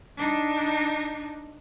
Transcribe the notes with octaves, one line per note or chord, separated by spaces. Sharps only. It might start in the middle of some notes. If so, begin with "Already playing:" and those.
D4 D#4